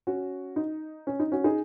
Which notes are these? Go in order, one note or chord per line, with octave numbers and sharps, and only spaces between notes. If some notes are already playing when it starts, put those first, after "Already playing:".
C#4 F#4
D#4
C#4
D#4
C#4 F#4
D#4 G#4